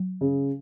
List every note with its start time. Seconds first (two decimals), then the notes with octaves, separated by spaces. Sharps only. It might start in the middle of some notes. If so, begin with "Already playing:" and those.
Already playing: F#3
0.21 C#3